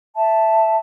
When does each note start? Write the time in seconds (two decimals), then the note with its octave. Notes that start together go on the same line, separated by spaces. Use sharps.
0.15 E5 A5